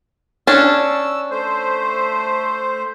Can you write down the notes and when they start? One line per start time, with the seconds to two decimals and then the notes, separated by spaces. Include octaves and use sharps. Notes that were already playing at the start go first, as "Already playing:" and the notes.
0.47 C#4 D4 E6
1.31 A3 C5